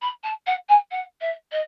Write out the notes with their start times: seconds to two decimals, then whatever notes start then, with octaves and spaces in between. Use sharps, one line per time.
0.01 B5
0.23 A5
0.46 F#5
0.68 G#5
0.91 F#5
1.21 E5
1.51 D#5